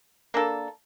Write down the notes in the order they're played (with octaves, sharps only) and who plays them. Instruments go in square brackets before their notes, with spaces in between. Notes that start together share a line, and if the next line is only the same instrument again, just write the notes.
[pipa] A#3 D4 A4